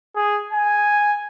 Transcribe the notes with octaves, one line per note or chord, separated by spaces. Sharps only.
G#4
G#5